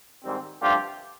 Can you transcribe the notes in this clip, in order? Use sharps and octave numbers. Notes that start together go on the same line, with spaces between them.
G#2 D#3 G3 C4
G2 D3 F3 A3 C4 F4 G4